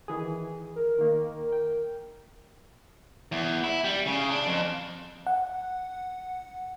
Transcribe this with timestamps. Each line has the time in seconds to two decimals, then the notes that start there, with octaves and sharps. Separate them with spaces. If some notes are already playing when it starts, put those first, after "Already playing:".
0.08 D#3 E3 G#4
0.76 A#4
0.99 D#3 A#3
1.52 G5
3.32 E2
3.64 E4
3.84 G3
4.07 C#3
4.31 D4
4.47 F2
5.27 F#5